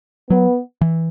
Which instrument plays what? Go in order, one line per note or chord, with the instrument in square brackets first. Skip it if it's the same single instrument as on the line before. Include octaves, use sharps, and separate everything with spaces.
[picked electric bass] F#3 [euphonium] B3
[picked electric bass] E3